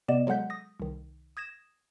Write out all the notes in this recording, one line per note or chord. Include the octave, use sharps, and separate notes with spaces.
C3 B3 D5 D#5 E7
F#3 G#3 A4 F#5 G6 B6
D#6 A#6
C2 D#3
D#6 G#6 A#6 E7